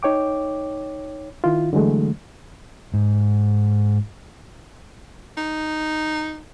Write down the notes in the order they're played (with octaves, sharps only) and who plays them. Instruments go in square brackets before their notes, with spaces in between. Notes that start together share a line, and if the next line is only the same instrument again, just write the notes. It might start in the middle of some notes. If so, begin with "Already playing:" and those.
[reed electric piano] D#4 C#5 G5 D6
D#3 E4 F4
D3 E3 F#3 G#3 A3
[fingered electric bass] G#2
[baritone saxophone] D#4